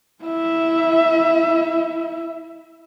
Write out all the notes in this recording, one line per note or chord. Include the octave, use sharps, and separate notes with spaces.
E4 E5